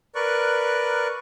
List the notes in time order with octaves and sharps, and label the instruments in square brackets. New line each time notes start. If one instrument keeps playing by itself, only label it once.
[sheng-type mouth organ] A#4 B4 D5 C#6 F#6